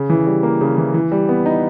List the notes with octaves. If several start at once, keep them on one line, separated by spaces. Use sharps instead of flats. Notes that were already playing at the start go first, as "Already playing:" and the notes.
Already playing: C#3
E3
G3
A#3
C#3
E3
E3
G3
B3
D#4